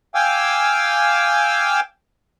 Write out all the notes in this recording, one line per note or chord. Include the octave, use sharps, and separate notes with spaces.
F5 G5 G#5 D6 E6